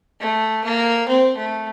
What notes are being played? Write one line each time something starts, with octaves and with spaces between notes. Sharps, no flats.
A3
A#3
C4
A3